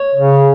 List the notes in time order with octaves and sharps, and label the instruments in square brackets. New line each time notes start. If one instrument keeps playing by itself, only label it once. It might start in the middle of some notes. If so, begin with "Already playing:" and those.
Already playing: [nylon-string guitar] C#5
[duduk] C#3